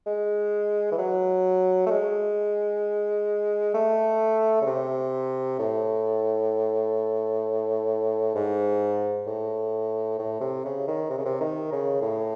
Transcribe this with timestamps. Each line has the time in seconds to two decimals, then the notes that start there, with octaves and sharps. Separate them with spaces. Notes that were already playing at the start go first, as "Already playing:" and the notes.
0.06 G#3
0.92 E3
0.98 F#3
1.87 A3
1.91 G#3
3.74 A3
4.62 C#3
4.66 C3
5.59 A2
8.35 G#2
9.27 A2
10.19 A2
10.41 C3
10.65 C#3
10.88 D#3
11.10 C3
11.18 C#3
11.25 C3
11.41 D#3
11.72 C#3
12.02 A2